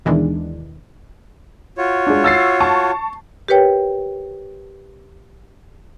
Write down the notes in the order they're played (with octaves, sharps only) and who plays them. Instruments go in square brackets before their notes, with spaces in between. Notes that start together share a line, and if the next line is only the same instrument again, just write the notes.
[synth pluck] D#2 B2 D#3 E3 G#3 D4
[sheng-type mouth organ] F4 F#4 C#5
[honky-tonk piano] G#3 D4
E6 A6 C7
A5 C#6
[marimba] G4 A#4 B4 C#5 G5